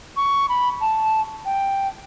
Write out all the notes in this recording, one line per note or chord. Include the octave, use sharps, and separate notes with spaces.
C#6
B5
A5
G5